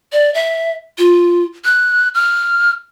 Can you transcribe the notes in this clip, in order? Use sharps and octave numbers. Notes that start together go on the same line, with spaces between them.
D5
E5
F4
F#6
F6